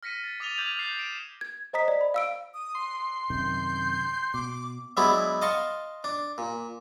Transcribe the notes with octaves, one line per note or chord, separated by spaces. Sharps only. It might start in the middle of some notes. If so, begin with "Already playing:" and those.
F6 A#6 B6 C#7 D#7
A6
D6 D#6 A6 D#7 F7 G7
D6 F6 G6 G#6 D#7 F#7
D6 F#6 G6 A6 C7
C7 D7 E7
G#6
C5 D#5 A#5 D#6 B6
D5
B5
F5 E6 D7
D#6
C6
F#2 C3 D#3 G6
B2 D6
F#3 G#3 B3 D4 E4
D#5 F5 A5 C6 C#6
D4
A#2